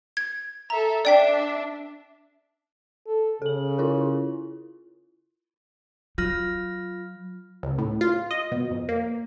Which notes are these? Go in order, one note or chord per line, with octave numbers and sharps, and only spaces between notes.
G#6
A4 E5 A#5
D4 D5 E5 G5 B6
A4
C#3 A4 F#7
E4 F4 A#4
F#3 F4 F6 A#6
C#2
A2
F4
D#5
B2
F2
A#3